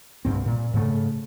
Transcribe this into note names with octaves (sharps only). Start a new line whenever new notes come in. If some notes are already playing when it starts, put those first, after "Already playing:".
C2 G2 C4
A#2
G#2 C#3 A3